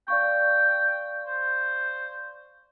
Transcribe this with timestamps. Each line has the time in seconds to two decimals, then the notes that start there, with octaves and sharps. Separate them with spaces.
0.08 D5 F5 G5 C#6
1.26 C5